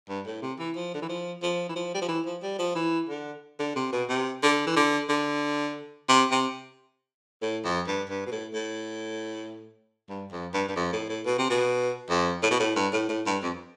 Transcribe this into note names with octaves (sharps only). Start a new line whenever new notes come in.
G2
A2
C3
E3
F3
D3
E3
F3
F3
E3
F3
G3
F3
E3
F3
G3
F3
E3
D3
D3
C3
B2
C3
D3
E3
D3
D3
C3
C3
A2
F2
G2
G2
B2
A2
A2
G2
F2
G2
G2
F2
A2
A2
B2
C3
B2
F2
A2
B2
A2
G2
A2
A2
G2
F2